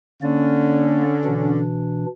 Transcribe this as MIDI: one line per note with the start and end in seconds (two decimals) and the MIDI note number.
0.22 1.64 50
0.22 1.03 58
0.22 1.64 61
0.22 1.03 74
1.25 2.06 47
1.25 2.06 52
1.25 2.06 62